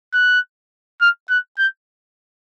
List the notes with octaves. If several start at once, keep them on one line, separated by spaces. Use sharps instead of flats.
F#6
F6
F#6
G6